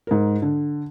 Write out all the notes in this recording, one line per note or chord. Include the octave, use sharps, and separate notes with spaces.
G#2 A#4
D3